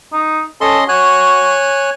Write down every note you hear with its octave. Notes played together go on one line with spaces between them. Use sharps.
D#4
C#4 A4 D#5 C6
F#4 C#5 G#5 F#6